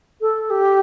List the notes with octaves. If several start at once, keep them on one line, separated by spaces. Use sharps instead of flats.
A4
G4